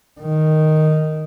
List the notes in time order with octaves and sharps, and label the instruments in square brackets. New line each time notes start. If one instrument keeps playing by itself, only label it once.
[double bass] D#3